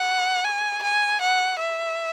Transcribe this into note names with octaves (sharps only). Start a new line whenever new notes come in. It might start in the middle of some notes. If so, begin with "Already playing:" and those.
Already playing: F#5
G#5
G#5
F#5
E5